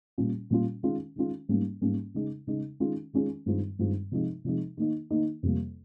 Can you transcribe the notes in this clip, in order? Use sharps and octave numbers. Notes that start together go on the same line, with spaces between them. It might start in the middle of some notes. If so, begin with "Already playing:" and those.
A#2 G3 C#4 F4
A#2 G3 C#4 F4
D#3 G#3 C#4 F4
D#3 G#3 C#4 F4
G#2 G3 A#3 C#4
G#2 G3 A#3 C#4
C#3 G#3 D#4
C#3 G#3 D#4
D#3 G#3 C#4 F4
D#3 G#3 C#4 F4
G2 D#3 G#3 C4 F4
G2 D#3 G#3 C4 F4
C3 F3 G#3 D#4
C3 F3 G#3 D#4
D#3 A#3 D#4
D#3 A#3 D#4
F2 C3 G3 A#3